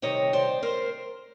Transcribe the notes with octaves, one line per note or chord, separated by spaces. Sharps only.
C3 D#3 G3 C4 D#4 C#5 D#5
C5 D5
A#4 C5